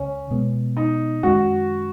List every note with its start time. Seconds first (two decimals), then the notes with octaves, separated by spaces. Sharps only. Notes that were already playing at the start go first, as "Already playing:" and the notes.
Already playing: C#2 C#3 C#4
0.31 B2 G#3 B3
0.77 D#4
1.23 F#2 D#3 G#3 C#4 F#4